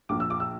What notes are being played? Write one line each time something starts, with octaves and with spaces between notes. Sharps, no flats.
A#1 A#2 F3 D6
E6
D6
E6